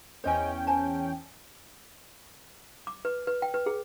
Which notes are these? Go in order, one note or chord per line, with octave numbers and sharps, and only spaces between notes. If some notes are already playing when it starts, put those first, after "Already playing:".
E2 C#4 C5 D#5 G5 G#5
C5 G#5 A5
D6
B4
B4
G5
B4
G#4